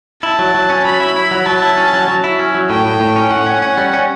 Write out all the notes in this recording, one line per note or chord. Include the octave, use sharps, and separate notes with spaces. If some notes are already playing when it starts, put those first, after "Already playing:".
E4 A5
F#3
F#3
C#4
F#3 B5
E4
E4
F#3
F#3 A5
E4
C#4
F#3
F#3
E4
C#4
F#3
A2 G5
A2
A2
C#4
A2 F#5
C#4
C#4
G3
C#4